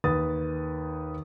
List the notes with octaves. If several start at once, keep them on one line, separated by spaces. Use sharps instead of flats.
D#2 B4 D#6 A6